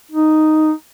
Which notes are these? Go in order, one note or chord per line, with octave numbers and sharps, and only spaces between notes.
D#4